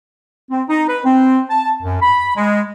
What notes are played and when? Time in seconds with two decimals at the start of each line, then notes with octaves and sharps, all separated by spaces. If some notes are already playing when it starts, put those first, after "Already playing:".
0.50 C4
0.69 D#4
0.88 B4
1.05 C4
1.50 A5
1.83 F#2
2.02 B5
2.36 G#3